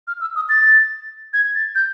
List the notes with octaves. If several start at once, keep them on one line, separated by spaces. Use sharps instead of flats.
F6
E6
D#6
A6
G#6
A6
G6